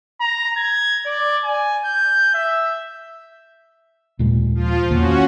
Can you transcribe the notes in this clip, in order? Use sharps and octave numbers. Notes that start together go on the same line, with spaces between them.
A#5
G#6
D5
G#5
G6
E5
D#2 A#2 G#3
F3 F4
E2 D#3 A#3 C#4 F#4